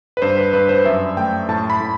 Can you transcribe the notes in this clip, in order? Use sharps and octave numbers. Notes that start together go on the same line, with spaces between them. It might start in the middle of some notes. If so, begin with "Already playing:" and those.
B4
G2 C5
B4
G2 B4
C5
F#2 E5
A3 G5
A2 A5
B5
A2